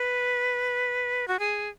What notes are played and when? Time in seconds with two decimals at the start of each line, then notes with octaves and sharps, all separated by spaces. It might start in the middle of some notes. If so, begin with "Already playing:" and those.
Already playing: B4
1.28 F#4
1.39 G#4